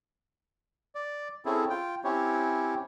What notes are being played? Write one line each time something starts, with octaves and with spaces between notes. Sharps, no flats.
D5
C4 C#4 E4 G#4 A4
F4 G5
C4 C#4 E4 G4 C#5